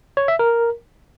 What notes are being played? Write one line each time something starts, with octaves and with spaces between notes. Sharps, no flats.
C#5
E5
A#4